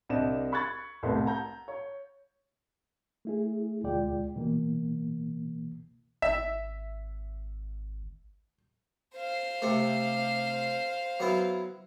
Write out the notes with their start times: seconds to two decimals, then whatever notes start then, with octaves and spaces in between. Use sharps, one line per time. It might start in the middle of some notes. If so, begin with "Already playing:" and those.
0.09 C2 C4 D4 D5 D#5 E7
0.52 B5 C#6 F#6 G#6 A6
1.03 F1 C2 A2 B3 C6
1.25 F#5 A5 A#5 G6
1.68 C#5
3.25 A3 E4 G#4
3.84 D2 B2 G#3 F4 D5 G5
4.36 B2 E3 A#3
6.22 G#1 E5
9.15 C5 F5
9.62 C3 A3
11.20 F#3 B3 E4